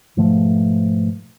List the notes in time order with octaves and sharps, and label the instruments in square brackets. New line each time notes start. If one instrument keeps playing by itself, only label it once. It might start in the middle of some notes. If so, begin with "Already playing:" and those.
[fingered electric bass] G#2 B2 F3 A3